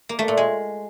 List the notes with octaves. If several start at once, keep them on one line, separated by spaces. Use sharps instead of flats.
A#3
A3
A#2
G#3